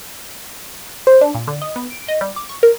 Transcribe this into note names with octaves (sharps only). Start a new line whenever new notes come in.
C5
D4
A#2
D3
D#5
B3
D7
D#5
G3
D6
C#6
A#4